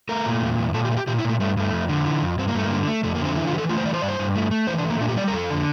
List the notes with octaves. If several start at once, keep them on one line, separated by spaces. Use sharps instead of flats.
A3 A#4
A#2
E2
E2
A#2 A4
G4
A3
G4
A#2 G4
E4
A#2
A3
G2 A3
G2 A3
F2
D3
E3
F2
G2 C4
A#3
G2 A3
A#3
D3
A3
F2 A3
A#3
D3 C4
E3 E4
F4
E3 G4
A4
A3 F4
C5
E3 D5
C5
G2 D5
C5
G2
A3
A3
E3 C5
D4
A3
A#3
A#2 D4
G4
G3 D5
A#4
F2 A4
D3